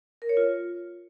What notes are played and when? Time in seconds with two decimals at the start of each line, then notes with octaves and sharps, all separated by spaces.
0.22 A#4
0.29 C#5
0.37 F4